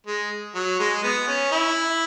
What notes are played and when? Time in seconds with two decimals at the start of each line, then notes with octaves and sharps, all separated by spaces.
0.07 G#3
0.55 F#3
0.80 G#3
1.03 B3
1.28 C#4
1.52 E4